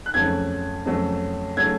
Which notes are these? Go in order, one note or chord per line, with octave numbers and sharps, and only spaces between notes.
F#6
F2 C#3 F#3 A3 C#4 G#6
F2 C#3 F#3 A3 C#4
C#3 F#3 A3 C#4 G#6